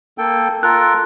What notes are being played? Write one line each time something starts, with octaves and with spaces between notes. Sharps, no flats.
A#3 A4 G5
F4 A4 A#4 F#6